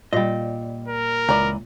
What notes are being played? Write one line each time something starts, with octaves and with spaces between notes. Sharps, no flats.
A#2 G3 D#5
A#4
C#2 E3 D5 A#5